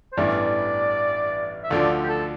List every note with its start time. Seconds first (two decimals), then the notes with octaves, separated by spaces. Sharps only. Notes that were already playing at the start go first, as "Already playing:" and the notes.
0.12 C5
0.17 A1 G2 E3 B3 D5
1.64 E5
1.70 D2 D3 F3 D5
2.04 G4
2.09 A4